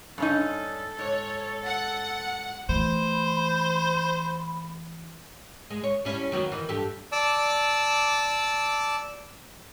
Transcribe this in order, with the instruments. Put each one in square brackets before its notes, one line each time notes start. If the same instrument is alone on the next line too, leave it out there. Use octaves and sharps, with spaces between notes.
[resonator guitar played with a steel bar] G2 C#4 D#4 [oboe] A4
[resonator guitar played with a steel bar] G#2 [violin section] C#5
[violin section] F#5
[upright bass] E3 A3 [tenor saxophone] C5 [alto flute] B5
[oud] G#3
C#5
G3 C#4 E4
D#3 F#3 B3
D#3 E3
G2 G4 A4
[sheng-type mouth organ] D5 A5 D6 E6